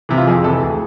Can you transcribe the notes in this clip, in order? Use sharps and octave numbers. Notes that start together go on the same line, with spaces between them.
C3 E3
F4
F2 G#4
C3 E3 A4
D2 G#4